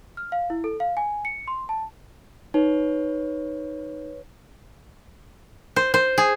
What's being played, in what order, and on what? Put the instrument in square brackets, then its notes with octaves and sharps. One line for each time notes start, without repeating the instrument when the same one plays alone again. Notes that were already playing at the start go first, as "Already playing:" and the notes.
[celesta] F6
F5
E4
A4
F5
G#5
C#7
C6
A5
[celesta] D#4 [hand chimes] B4 C#5
[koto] C5
C5
G#4